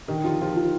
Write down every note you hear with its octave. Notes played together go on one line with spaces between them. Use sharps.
D3 D#3 D#4
D#2 F3 F4
D#2 F3 F4
F3